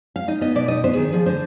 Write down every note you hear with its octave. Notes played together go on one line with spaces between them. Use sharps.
F5
D#4 D#5
B3 D#5
B2 D5
D#4 D#5
B3 C5
G#4
D#3
F3 G#4
D3 C5